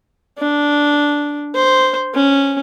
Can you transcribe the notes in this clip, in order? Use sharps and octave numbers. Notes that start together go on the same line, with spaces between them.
D4
C5
C#4